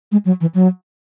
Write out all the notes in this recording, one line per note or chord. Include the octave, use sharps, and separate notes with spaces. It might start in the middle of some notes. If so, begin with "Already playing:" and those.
G#3
F#3
E3
F#3